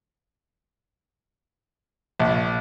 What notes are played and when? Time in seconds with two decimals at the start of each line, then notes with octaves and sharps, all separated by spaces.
2.20 A#1